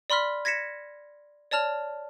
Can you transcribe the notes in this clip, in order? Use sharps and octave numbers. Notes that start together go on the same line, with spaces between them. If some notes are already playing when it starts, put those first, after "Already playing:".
D5 B5 C6 F6 B6
G#6 A#6 B6 C#7 E7
C#5 D5 A5 F6 F7